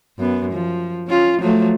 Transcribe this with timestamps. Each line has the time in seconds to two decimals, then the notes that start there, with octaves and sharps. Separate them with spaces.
0.18 F#2 B3
0.53 F3
1.08 C#4 F4
1.39 F3 F#3 A3